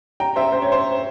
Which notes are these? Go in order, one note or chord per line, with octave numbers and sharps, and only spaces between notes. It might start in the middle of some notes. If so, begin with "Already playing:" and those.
G5 A#5
C5 E5
C5
C#5
C5